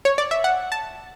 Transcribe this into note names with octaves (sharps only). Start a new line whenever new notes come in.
C#5
D5
E5
F#5
A5